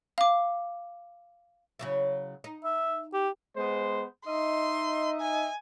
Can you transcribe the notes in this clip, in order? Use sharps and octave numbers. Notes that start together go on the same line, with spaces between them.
F5 D6
C#3 F#3 E4
D#4
E5
G4
G#3 B3 C5
D#4 D#5 E5 C6
G#5